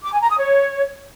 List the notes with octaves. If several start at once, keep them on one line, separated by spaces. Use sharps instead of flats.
D6
G#5
A#5
D#6
C#5